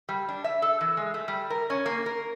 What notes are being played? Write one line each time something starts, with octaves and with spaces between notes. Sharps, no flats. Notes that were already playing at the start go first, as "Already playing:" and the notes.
G3
D4
E5
A4
E3
G#3
A3
G3
A#4
C#4
A#3
A#4